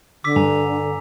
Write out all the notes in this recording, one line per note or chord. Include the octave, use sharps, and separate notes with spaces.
D3 D6 E6 B6
G2 G#5 A#5